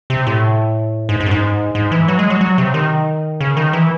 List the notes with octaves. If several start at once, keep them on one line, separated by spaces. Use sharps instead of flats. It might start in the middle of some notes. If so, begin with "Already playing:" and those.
C3
A2
G#2
G#2
F#2
G#2
G#2
E3
F#3
G#3
F#3
F#3
C3
D#3
C#3
D#3
E3